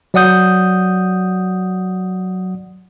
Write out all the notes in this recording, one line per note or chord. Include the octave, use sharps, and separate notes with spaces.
F#3 D5 F#5 D#6 G6